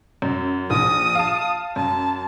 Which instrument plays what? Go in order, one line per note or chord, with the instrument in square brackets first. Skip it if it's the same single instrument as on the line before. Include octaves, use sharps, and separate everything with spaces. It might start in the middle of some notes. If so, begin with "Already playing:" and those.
[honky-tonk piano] F#2
[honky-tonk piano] A#1 [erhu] D#6
[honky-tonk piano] F5 A5
[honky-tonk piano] F#2 [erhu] A5